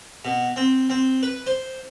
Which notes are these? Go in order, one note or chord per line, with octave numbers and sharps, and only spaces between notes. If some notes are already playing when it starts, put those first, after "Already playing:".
B2
C4
C4
B4
C5